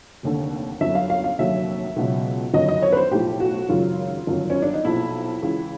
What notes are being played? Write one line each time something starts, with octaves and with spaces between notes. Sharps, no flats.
F1 D#2 D3
G1 F#2 D3 F#3 E5
F5
F5
F5
F1 D#2 D3 F#3 E5
C#2 B2 F#3
G1 F#2 D#3 F#3 D#5
D#5
C#5
B4
C5
B1 A2 F3 G4
F#4
G#1 F#2 C#3 F#3 F4
G1 F#2 D#3 F#3
C#4
D4
D#4
B1 A#2 F3 E4
C#2 C#3 E3